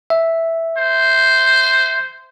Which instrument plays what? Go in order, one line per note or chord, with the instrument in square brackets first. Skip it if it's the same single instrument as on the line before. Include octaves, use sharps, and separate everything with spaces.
[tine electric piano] E5
[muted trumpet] C5